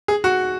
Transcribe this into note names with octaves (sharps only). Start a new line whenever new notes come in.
G#4
F#4